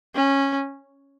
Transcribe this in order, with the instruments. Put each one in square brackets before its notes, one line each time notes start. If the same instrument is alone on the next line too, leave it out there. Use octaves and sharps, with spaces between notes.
[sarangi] C#4